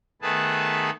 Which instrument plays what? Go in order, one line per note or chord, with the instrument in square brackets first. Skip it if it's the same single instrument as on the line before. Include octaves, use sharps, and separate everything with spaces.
[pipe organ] D#3 A3 B3 G#4 B4 A5